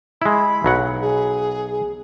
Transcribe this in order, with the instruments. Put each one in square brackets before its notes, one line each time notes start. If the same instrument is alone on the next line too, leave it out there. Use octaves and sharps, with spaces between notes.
[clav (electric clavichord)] G#3 E4 [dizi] B5
[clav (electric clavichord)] B1 F#3 F#5
[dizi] G#4